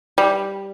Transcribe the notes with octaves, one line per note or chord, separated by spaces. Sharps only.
G3